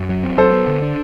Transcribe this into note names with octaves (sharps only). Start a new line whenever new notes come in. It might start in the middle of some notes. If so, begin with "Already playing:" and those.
Already playing: F#2
F#3
C4
F#3 A4 C5
B3
D3
D4